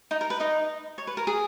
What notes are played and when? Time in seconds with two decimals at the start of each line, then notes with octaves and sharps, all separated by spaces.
0.11 D#4
0.21 A#4
0.30 B4
0.40 D#4 D#5
0.98 C#5
1.07 B4
1.17 A#4
1.27 G#4